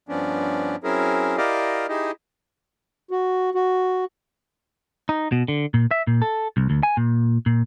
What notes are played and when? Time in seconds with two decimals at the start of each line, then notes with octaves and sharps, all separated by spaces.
0.09 G2 F3 B3 C#4 D4
0.84 F#3 C4 C#4 E4 G#4 A#4
1.37 E4 G4 A#4 D5 D#5 F5
1.88 D#4 E4 G4 G#4 D#5
3.11 F#4
3.55 F#4
5.09 D#4
5.32 B2
5.48 D3
5.74 A#2
5.91 E5
6.07 A#2
6.22 A4
6.57 C2
6.70 D2
6.83 G#5
6.97 A#2
7.46 A#2